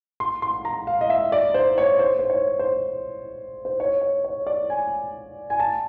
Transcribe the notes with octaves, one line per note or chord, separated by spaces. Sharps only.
C6
C6
A#5
F5
D#5
E5
D5
C5
C#5
C5
C5
C#5
C5
C5
C#5
C#5
C#5
D5
G#5
G#5
A5